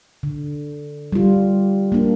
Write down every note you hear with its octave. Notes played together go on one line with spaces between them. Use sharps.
D3
G3 F4
A#3 D4